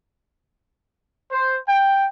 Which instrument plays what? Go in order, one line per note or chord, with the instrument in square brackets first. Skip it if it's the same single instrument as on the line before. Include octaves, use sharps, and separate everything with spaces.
[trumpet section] C5
G5